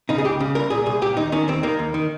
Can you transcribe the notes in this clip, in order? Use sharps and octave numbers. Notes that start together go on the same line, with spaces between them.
C#3 D#4
G#4
C#2 G4
C#3
C2 A#4
A#2 G#4
C2 G#4
A#2 G4
D#2 D#4
D#3 C#4
D#2 C4
D#3 A#3
D#2
D#3